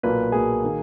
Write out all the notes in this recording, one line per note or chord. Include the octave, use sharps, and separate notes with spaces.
B1 A#2 A#3 B4
B1 A#2 A#3 G#4
D#3 A#3